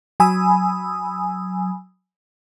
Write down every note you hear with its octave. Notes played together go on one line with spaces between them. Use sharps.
F#3 G#5 B5 D#6 E6